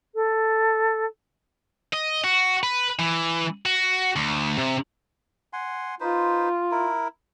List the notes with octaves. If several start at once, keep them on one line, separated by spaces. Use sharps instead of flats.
A4
D#5
F#4
B4
E3
F#4
D2
C3
F#5 G#5 C6
D#4 F4 B4 C5
E4 A#4